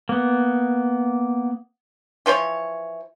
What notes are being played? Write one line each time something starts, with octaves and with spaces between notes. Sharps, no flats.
A#3 B3
E3 F3 C5 C#5